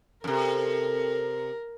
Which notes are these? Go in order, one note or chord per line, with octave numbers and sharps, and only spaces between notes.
F#2 C3 A4 A#4